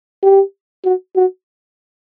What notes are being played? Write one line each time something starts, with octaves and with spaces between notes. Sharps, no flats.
G4
F#4
F#4